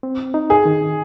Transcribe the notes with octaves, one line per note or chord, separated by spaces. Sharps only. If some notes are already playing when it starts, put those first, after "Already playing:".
C4
D#4
G#4
D#3